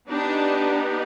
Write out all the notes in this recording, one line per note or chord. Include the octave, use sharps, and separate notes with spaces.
B3 D4 D#4 G4